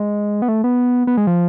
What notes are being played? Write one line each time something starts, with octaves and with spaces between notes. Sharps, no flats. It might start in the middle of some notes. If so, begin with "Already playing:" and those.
Already playing: G#3
B3
A3
B3
B3
G#3
F3